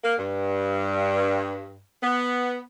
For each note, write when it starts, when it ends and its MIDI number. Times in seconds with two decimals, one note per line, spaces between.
0.04 0.14 58
0.18 1.81 43
2.02 2.61 59